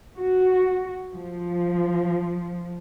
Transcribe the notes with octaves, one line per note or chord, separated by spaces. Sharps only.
F#4
F3